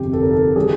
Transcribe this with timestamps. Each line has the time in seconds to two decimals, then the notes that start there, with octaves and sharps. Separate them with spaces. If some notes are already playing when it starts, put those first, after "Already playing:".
Already playing: G1 F2 C3 G4
0.13 A4
0.22 A#4
0.31 A4
0.56 D#3 G3 G#4